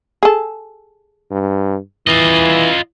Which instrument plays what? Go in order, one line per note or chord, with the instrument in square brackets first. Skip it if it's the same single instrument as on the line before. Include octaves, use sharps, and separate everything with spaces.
[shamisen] G#4 A4
[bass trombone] G2
[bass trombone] E3 [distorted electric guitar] F4 D#5